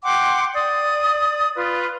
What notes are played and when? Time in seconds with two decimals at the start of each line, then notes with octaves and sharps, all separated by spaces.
0.03 F#5 G5 C6 D6
0.54 D5 D#6
1.56 F4 B4